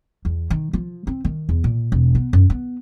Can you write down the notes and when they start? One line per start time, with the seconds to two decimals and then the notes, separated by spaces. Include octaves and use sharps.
0.25 E2
0.50 D#3
0.73 F3
1.07 C4
1.25 D#3
1.49 E2
1.64 A#2
1.92 E1
2.15 B3
2.33 F#2
2.50 B3